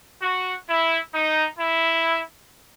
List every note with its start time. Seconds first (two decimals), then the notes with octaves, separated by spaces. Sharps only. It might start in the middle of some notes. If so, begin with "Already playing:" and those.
0.22 F#4
0.68 E4
1.14 D#4
1.59 E4